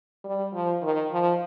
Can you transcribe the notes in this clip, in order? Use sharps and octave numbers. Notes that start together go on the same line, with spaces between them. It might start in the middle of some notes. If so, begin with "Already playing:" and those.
G3
F3
D#3
F3